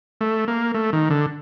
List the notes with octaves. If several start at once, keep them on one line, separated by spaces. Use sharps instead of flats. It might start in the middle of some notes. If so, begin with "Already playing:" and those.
A3
A#3
A3
D#3
D3